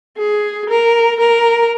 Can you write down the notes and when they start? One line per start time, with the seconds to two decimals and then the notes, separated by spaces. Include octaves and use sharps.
0.18 G#4
0.69 A#4
1.20 A#4